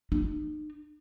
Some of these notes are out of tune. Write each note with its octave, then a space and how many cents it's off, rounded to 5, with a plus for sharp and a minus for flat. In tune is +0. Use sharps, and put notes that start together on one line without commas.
D#4 -45